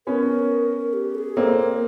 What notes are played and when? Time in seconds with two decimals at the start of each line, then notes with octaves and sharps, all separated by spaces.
0.07 B3 C#4 A#4
0.93 G4
1.15 A4
1.18 G#4
1.37 A#3 C4 A4
1.59 B4
1.63 A#4